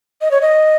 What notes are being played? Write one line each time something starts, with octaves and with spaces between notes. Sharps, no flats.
D#5
C#5
D#5